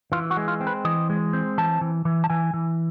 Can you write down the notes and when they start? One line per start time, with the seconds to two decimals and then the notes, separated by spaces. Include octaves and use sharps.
0.12 E3 F4
0.31 F#4
0.37 G#3
0.48 F4
0.61 C4
0.67 B4
0.85 E3 D#5
1.10 G#3
1.33 C4
1.58 E3 A5
1.81 E3
2.05 E3
2.24 A5
2.30 E3 G#5
2.54 E3